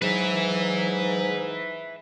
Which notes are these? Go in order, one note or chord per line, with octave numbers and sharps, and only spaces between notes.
G#2 F#3 B4 E5